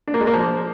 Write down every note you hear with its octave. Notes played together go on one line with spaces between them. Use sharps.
D4
A#3
G#3
A#3
F3